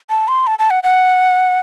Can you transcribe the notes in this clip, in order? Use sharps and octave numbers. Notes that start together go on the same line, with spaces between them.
A5
C6
A5
A5
F#5
F#5